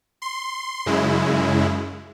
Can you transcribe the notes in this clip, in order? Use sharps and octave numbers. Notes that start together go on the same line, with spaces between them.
C6
F#2 C#3 G#3 E4